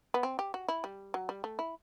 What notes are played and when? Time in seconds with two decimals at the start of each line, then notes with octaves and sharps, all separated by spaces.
0.14 B3
0.23 C4
0.39 G4
0.54 F#4
0.68 E4
0.84 G3
1.14 F#3
1.29 G3
1.44 A3
1.59 E4